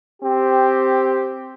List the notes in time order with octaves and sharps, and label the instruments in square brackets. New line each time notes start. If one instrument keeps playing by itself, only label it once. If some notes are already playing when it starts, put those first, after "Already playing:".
[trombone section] C4 G4